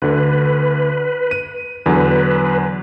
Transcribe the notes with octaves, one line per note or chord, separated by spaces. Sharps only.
D2 D3 B4
D#7
E2 D3 F#3 B4